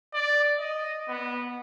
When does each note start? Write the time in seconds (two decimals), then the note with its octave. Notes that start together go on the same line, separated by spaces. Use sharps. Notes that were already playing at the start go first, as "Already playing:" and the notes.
0.14 D5
0.60 D#5
1.09 B3